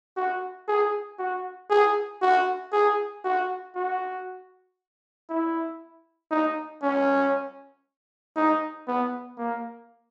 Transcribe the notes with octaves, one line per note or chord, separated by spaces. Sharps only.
F#4
G#4
F#4
G#4
F#4
G#4
F#4
F#4
E4
D#4
C#4
D#4
B3
A#3